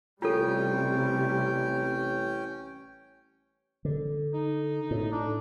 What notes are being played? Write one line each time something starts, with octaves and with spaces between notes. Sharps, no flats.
A1 C3 G3 C#4 F4 A4 G5
D3
D#4
A2
D4